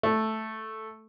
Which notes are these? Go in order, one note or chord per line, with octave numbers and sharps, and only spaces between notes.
A3